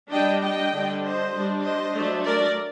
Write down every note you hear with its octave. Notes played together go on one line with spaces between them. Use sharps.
G3 D4 D#5 G5
D#5 G5
D3 G3 D4
C5 D#5
G3 D4
C5 D#5
F#3 A3 D4
A#4 D5